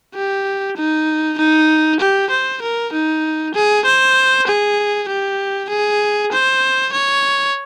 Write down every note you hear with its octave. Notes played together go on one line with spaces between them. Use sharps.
G4
D#4
D#4
G4
C5
A#4
D#4
G#4
C5
G#4
G4
G#4
C5
C#5